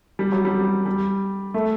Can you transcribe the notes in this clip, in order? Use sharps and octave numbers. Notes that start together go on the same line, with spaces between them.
G3
F#3
G3
G3
A3